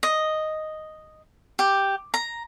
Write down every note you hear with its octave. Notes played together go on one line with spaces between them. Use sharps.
D#5
G4
A#5